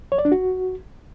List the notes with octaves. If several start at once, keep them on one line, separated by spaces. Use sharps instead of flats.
C#5
D5
D4
F#4